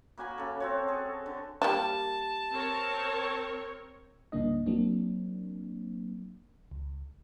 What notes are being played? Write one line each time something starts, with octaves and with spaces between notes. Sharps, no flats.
A#3 F#4 G#5 B5
C#3 A4
C4 F#4 C#5
G#4 A4
D3
G3 A#3 D4 A5
C4 A#4 C#5
C2 G2 C#3 A#3 D4 D#5
F#3 A#3 C4 D4
C#2